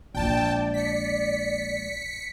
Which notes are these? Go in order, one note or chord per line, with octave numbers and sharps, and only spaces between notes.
A#1 G#3 D5 G5 A5
B6 C#7